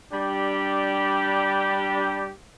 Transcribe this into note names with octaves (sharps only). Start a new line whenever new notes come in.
G3 D4 G4